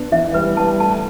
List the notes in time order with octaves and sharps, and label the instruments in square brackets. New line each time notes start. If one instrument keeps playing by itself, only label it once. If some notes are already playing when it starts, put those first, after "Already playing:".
Already playing: [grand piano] B3 D4
[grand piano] E3 [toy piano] E5
[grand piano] G3 [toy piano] B4
[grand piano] G3 [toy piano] A5
[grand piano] A3 [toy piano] A5